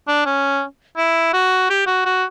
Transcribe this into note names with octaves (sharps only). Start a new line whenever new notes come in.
D4
C#4
E4
F#4
G4
F#4
F#4